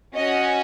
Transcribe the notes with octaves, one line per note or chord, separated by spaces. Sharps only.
C#4 F#4 D#5